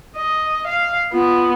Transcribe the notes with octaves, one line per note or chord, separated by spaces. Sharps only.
D#5
F5
B3 F4